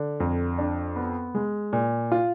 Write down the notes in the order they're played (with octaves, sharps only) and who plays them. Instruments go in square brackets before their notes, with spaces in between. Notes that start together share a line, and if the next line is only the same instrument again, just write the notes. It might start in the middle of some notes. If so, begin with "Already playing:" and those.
Already playing: [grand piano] D3
F2
D4
B3
G#3
A#2
F4